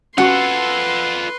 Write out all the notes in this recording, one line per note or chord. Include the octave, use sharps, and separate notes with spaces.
C#4 F4 F#4 A4 B4 F#5 C6 C#6